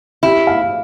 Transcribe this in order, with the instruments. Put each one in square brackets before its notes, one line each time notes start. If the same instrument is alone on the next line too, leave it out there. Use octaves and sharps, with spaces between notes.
[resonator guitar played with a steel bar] E4 [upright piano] G4
[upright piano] F5